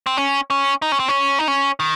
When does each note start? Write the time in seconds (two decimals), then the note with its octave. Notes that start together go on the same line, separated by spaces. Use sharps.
0.06 C4
0.17 C#4
0.50 C#4
0.82 D#4
0.92 C#4
1.00 C4
1.08 C#4
1.39 D#4
1.48 C#4
1.80 D#3